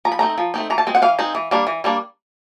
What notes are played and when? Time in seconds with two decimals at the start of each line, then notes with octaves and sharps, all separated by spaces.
0.05 F3 A#5
0.12 B5
0.19 A3 C4 D#4 A#5
0.38 F3
0.54 A3 C4 D#4
0.70 E3 A#5
0.78 A5
0.87 G#3 C4
0.95 F#5
1.02 E3 F5
1.19 G#3 C4 D#4
1.35 E3
1.51 G3 A#3 D4
1.67 E3
1.84 G3 A#3 D4